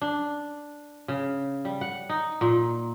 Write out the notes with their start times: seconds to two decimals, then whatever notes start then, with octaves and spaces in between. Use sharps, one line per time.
0.01 D4
1.08 C#3
1.65 G3
1.81 F#5
2.09 D#4
2.41 A#2